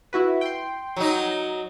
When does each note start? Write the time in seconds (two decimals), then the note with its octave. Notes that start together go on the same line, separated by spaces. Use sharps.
0.13 E4 F#4 B4
0.41 G5 C6
0.96 F#3 D#4